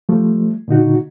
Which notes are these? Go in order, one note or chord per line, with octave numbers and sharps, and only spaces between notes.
F3 G3 A3
A#2 D3 D#4 F#4